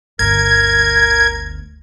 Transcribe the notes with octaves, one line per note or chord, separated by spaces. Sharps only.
G1 D2 A#4 G#6